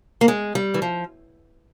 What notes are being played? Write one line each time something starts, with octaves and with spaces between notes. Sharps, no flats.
A#3
G#3
G3
E3
F3